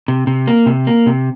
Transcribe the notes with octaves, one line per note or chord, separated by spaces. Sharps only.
C3
C3
A#3
C3
A#3
C3